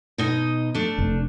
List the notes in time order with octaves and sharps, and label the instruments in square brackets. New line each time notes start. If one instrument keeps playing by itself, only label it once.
[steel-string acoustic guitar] B2 D#4 D#5
A3 D4
[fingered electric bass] F1